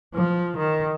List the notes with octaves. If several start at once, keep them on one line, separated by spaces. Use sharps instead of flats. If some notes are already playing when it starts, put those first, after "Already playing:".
F3
D#3